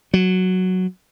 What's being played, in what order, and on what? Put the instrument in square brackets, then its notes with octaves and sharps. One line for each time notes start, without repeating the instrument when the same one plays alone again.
[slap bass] F#3